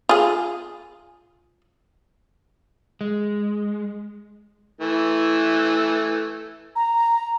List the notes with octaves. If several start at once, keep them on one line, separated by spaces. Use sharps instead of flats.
F4 G#4
G#3
E3 A3
A#5